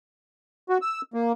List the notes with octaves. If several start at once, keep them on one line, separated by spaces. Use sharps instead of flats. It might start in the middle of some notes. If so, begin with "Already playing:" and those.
F#4
E6
A#3